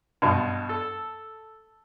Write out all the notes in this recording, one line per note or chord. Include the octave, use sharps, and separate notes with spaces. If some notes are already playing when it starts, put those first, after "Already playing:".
G2 B2
A4